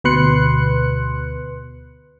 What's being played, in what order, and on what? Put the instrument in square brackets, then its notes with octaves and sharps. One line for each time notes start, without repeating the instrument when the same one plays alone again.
[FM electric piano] D2 B2 B4 C6 F#6 C#7